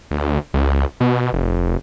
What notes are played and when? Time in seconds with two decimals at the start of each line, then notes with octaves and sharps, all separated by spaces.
0.11 D2
0.54 C#2
1.00 B2
1.33 F1